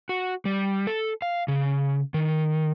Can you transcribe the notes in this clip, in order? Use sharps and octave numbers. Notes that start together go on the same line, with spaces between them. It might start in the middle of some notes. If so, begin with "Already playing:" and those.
F#4
G3
A4
F5
C#3
D#3